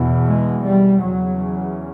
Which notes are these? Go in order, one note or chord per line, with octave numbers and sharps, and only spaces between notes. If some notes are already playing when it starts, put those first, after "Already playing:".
Already playing: E2 B2
G#3
G3
E2 C#3 F#3